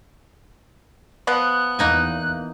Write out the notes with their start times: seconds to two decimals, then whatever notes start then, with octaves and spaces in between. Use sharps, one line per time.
1.27 F3 B3 F#6
1.79 E2 A#3 D#4 G#5